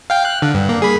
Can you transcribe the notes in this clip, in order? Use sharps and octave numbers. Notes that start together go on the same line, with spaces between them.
F5 G5
F#6
D3
G2
A#3
G#4 B5